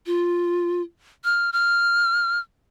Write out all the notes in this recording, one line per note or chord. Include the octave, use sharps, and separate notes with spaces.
F4
F6
F6